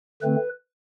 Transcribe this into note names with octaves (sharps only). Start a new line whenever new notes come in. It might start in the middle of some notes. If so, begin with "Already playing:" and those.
D3 A3 C4 B4